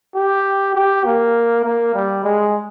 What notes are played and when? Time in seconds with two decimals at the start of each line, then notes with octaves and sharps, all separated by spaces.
0.15 G4
0.75 G4
1.05 A#3
1.64 A#3
1.94 G3
2.24 G#3